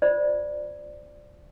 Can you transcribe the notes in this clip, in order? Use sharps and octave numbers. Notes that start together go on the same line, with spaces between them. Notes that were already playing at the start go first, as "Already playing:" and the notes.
F4 C5 D5